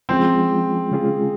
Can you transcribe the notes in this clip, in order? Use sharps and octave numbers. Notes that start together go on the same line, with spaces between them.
F3 G#3 C4 C#4 F4 G#4
C#3 G#3 C#4 F4 G#4